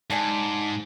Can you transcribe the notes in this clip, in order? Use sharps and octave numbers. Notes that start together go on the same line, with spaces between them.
G#2 D4 D5 G#5